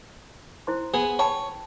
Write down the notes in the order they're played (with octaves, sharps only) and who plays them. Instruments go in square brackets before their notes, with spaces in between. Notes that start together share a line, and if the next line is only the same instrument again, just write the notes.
[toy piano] E4 C5 C6
[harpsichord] B3 G#4
[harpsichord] C#5 [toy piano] G5 A5 B5